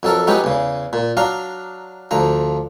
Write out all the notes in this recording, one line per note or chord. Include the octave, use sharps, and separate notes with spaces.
F2 F#3 A4 A#4
F#3 G#3 B3 D#4 G4 C#5
E2 C#3
A#2
F#3 D4 F5 A#5
D2 F3 A#5